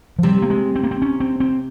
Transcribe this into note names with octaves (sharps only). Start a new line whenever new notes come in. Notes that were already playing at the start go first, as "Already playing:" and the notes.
F3
C3 G3
A#3
G#3
C4
A#3
C4
C#4
C4
C4